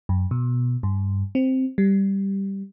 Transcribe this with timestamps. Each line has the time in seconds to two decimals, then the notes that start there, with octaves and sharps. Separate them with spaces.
0.09 F#2
0.31 B2
0.83 G2
1.35 C4
1.78 G3